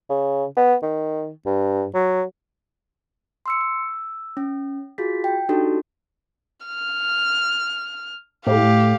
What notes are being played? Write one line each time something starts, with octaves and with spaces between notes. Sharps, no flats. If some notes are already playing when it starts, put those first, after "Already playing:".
C#3
B3
D#3
G2
F#3
C6 E6 C#7
E6
C#4
F4 F#4 G#4 A6 B6
G5
D4 D#4 F#4 G4 A4
F6
A2 G4 F5